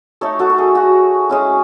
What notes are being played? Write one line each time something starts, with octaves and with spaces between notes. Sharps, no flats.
A3 D#4 A4 C#5
F#4 A4
A4
G#4
F#4
G#3 C#4 E4